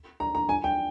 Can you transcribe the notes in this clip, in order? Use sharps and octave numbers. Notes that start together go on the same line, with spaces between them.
A#5
A#5
G#5
G5